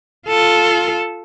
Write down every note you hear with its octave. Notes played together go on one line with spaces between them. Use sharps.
F4 A4